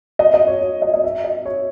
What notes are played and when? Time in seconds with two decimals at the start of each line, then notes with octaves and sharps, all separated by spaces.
0.19 D#5
0.34 D#5
0.47 C#5
0.62 C#5
0.82 D#5
0.94 D#5
1.04 E5
1.24 D#5
1.45 C#5